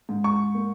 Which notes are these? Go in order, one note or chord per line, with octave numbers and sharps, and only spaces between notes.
G#2
C#6
A#3